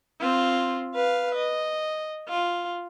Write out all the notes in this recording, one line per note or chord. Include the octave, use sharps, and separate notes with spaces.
C4 F4
B4 F5
D#5
F4